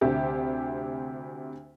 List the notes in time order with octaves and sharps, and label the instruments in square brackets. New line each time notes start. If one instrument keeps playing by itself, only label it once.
[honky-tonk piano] D2 C3 G4 E5